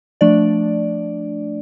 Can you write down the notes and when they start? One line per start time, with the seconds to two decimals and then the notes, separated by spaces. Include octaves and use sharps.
0.21 F3 A3 D4 D5